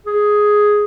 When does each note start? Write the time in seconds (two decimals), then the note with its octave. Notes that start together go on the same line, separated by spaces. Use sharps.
0.06 G#4